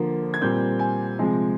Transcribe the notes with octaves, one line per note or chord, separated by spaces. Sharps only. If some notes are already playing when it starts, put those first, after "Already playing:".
Already playing: D3 F3 A#3
G#6
A#2 G3 C4 G6
G#5
C3 F3 G#3